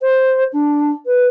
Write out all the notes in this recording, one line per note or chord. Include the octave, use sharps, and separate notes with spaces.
C5
D4
B4